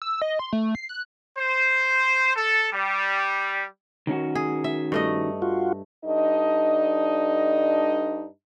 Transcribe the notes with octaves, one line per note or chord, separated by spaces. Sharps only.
E6
D#5
C6
A3
C7
F#6
C5
A4
G3
D#3 C#4 F#4
G#4
E5
G2 A3 D#5
F4 F#4
G2 D4 D#4 A4 D#5